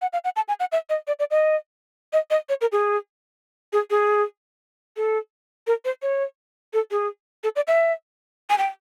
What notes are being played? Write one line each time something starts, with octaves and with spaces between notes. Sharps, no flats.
F#5
F5
F#5
A5
G#5
F#5
E5
D#5
D5
D5
D#5
D#5
D#5
C#5
A#4
G#4
G#4
G#4
A4
A#4
C5
C#5
A4
G#4
A4
D5
E5
G#5
G5